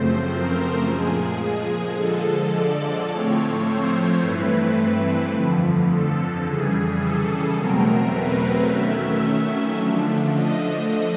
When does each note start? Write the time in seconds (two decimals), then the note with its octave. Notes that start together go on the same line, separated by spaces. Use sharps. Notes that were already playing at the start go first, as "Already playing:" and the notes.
Already playing: F#2 C#3 F3 A3 C4 C5
0.29 A#4
0.84 A#2 F3 G#3 G#4
1.95 D3 F3 G#3 A4
2.52 D5
3.07 A2 F3 A3 C4 C#5
3.63 C5
4.18 G2 E3 A3 C4 E4 B4
5.31 F2 D3 F3
5.86 A4
6.41 C#3 E3 G3 G#4
6.97 A4
7.53 E2 B2 F#3 A3 C4 A#4
8.09 B4
8.64 D#3 F#3 A3 C#4 E5
9.75 D3 F3 A3 D4
10.31 D#5